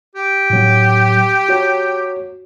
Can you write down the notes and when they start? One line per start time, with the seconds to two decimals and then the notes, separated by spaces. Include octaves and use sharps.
0.15 G4
0.50 A2 F#3
1.49 F#4 C#5